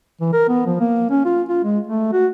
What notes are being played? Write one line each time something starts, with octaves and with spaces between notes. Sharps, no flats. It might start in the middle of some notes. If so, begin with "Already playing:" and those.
E3
A#4
B3
F3
A#3
C#4
F4
F4
G#3
A3
F#4